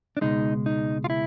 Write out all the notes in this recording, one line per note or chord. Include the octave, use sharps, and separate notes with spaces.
D4
C#2 B2 G#3 D#4
D#4
F4
E4